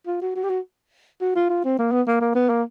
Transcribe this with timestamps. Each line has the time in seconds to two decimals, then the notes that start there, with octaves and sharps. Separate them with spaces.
0.07 F4
0.21 F#4
0.36 F#4
0.43 G4
0.49 F#4
1.21 F#4
1.35 F4
1.49 F4
1.64 C4
1.79 A#3
1.92 B3
2.07 A#3
2.21 A#3
2.35 B3
2.49 A#3